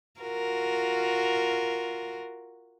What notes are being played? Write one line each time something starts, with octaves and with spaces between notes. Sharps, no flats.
F4 F#4 A#4